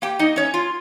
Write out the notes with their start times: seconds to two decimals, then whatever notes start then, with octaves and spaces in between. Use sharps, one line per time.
0.02 A#3 G4 G5
0.19 D#4 D#5
0.36 C#4 D#4 C#5
0.54 F4